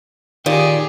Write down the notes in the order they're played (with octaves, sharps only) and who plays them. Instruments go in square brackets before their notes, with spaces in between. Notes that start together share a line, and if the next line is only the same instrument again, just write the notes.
[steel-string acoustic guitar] A#2 [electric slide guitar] D#3 [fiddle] G4 G#4